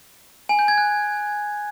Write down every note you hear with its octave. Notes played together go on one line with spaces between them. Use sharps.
G#5
G6
G#6
F#6